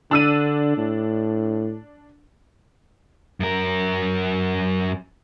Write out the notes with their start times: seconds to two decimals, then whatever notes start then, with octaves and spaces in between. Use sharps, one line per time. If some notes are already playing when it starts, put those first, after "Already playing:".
0.11 D3 D4 E6 D#7
0.77 A2
3.40 F#2 A#4